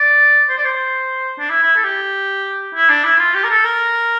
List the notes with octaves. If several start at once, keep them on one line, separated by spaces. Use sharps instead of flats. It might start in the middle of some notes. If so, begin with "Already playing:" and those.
Already playing: D5
C5
D5
C5
D4
E4
E4
A4
G4
E4
D4
E4
F4
G4
A#4
A4
A#4